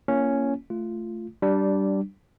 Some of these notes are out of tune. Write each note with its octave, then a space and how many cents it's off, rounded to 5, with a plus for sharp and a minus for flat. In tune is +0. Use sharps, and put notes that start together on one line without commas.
A#3 +0 C#4 +0 F4 -40
A3 +0 F4 -15
G3 -15 D4 +0